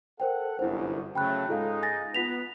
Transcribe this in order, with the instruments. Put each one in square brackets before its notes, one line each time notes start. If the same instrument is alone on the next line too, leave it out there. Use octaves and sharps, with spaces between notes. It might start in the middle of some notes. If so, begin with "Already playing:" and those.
[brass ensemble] A4 F#5 [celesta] A#4 C5 G5
[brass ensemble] G1 C2 F#2 [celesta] E4 C5
[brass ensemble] C#3 F#3 A3 [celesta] G5 B5 F#6
[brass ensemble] G#2 G#3 D#4 [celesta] F4 A4 F5
[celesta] G#5 A6 A#6
[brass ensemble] B3 [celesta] F4 B6 F7